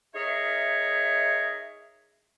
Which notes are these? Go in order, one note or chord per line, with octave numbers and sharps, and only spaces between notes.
D#4 G#4 A#4 C#5 E5